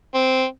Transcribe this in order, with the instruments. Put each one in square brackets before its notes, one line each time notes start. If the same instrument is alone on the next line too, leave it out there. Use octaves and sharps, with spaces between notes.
[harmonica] C4